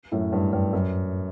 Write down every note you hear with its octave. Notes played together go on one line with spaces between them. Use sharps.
F#2 A2
G2
G2
F#2